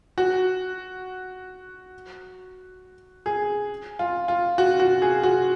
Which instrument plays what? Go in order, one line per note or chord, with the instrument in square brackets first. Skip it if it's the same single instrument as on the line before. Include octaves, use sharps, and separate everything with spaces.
[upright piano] F#4
G#4
F4
F4
F#4
F#4
G#4
F#4